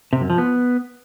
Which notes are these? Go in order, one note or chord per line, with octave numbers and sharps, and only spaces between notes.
C3
F#2
F3
B3